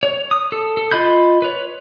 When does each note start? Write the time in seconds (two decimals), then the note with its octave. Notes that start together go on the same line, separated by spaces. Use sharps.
0.03 C#5
0.31 D#6
0.52 A4
0.77 A4
0.91 F4 D#5 B5 G6
1.42 B4 C#5